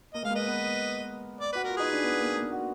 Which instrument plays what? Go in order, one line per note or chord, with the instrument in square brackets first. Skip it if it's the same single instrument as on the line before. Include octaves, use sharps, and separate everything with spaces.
[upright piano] A#3 [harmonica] D#5
[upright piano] G#3 [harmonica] F5
[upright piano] A#3
[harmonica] B4 D#5
[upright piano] B3
[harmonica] D5
[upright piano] F#4 [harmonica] B4
[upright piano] F4 [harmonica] A#4
[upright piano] D#4 [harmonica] G#4 B4
[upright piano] D4
B3
A#3
A#3
F#4